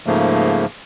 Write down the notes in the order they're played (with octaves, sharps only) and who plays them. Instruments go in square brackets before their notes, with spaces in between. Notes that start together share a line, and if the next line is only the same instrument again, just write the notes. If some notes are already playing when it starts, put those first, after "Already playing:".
[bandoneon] G#2 C#3 F3 A3 A#3